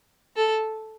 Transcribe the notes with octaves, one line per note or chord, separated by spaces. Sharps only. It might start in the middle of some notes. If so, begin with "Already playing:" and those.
A4